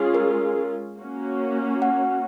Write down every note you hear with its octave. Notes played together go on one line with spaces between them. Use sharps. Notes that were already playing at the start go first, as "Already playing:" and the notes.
Already playing: G#3 C#4 F4 G#4
A#4
A#3 C#4 F#4
F#5